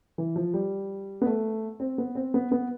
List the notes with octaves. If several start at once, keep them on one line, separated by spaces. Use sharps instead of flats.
E3
F3
G3
B3
A3
C4
B3
C4
B3
B3